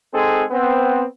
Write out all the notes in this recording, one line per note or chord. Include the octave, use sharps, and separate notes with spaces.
G#3 C4 D#4 G#4 A4
B3 C4